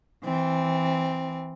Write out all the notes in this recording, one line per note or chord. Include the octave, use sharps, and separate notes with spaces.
E3 C4